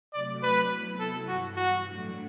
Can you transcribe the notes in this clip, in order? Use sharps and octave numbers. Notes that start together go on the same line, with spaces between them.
C3 F#3 A3 D5
B4
C3 F#3 B3 E4
A4
G2 E3 G3 F#4
F#4
A2 F#3 A3 D4